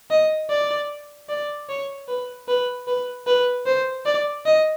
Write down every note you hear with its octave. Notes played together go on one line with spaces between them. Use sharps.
D#5
D5
D5
C#5
B4
B4
B4
B4
C5
D5
D#5